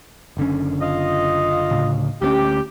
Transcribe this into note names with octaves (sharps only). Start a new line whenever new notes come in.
F#1 D3 C#4
F4 D#5
D2 A2 C#3
D2 B3 C#4 G4